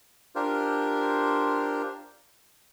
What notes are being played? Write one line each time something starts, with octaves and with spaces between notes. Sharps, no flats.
D4 F4 G4 A#4 C5